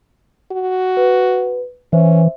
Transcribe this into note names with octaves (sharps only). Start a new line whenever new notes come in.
F#4
B4
E3 C#4 C5 E5